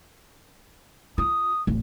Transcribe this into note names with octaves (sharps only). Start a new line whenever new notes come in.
F4 D#6
D1 A1